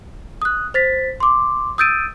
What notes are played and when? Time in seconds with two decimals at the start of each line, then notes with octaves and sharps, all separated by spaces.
0.42 D#6 F#6
0.74 C5 A6 B6
1.20 C6 D6
1.78 D#6 E6 G6 A6 D7 D#7